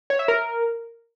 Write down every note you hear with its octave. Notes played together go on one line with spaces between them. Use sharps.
C#5
E5
A#4